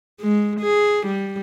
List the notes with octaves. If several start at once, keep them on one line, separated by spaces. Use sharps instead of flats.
G#3
G#4
G3